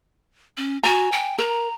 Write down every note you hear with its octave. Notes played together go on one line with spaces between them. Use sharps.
C#4
F#4 G#5 A#5
G5
A#4 A#5